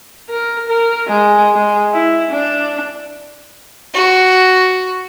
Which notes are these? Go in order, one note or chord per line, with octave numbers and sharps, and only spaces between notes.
A#4
A#4
G#3
G#3
E4
D4
F#4